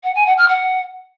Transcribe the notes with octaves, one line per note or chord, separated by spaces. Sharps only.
F#5
G#5
F#5
F6
F#5